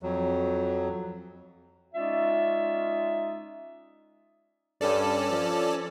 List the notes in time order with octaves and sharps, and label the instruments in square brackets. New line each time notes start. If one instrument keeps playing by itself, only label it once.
[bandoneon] F2 F#3
[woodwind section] G#3 C#4 D#4 F4 D5 E5
[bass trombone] G2 [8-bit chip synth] C#4 A4 D5
[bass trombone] F3